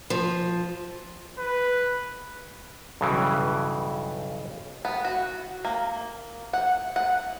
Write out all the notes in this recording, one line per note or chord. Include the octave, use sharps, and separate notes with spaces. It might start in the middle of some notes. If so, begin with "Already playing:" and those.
F3
B4
B1 G2 C#3 E3
B3
F#4
A#3
F#5
F#5